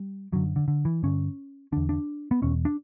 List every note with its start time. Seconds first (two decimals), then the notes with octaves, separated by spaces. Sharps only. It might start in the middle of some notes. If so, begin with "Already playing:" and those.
Already playing: G3
0.32 F#2 D3 F#3
0.56 D3
0.68 D3
0.85 E3
1.03 G2 D3 C#4
1.72 E2 D3 D4
1.89 D4
2.31 B3
2.42 E2 B2 C#4
2.65 D4